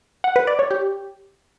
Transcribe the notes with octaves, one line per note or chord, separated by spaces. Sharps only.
F#5
B4
D5
C#5
G4